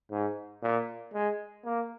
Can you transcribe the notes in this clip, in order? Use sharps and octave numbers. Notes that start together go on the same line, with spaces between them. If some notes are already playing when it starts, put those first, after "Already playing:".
G#2
A#2
G#3
A#3